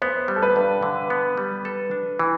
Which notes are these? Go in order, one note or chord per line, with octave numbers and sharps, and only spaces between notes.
B3 C5
G3
A4
B4
G2
D3
B3
G3
A4
D4
E3